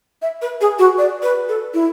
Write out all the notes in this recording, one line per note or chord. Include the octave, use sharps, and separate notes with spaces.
E5
B4
G#4
F#4
D5
B4
A4
E4